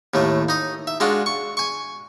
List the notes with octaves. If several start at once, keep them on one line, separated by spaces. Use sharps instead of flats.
D#2 A2 A3
D#4 D#5
E5
G#3 D4 F4 F#4
C#6
G#5 C#6